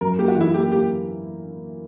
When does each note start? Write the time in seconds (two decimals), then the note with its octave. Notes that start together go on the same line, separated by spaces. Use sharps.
0.01 F#2 A#4
0.18 A#3 G4
0.28 F#4
0.36 E3 E4
0.54 A#3 G4
0.72 A#3 G4